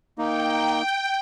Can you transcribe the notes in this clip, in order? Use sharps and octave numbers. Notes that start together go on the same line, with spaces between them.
A#3 D#4 G5